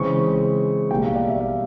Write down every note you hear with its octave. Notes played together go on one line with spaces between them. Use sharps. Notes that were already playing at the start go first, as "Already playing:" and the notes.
Already playing: C#3 E3 G#3 C4 C#6
B2 G3 A#3 G5
F5
D5
E5
F5